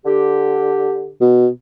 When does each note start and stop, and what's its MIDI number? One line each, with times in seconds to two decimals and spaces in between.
0.05 1.09 50
0.05 1.09 67
1.21 1.48 47